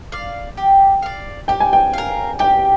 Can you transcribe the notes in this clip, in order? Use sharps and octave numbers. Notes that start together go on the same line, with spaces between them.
D5 F5
G4
D5 F5
G4 G5
G#5
G5
A#4 F5
G4 G5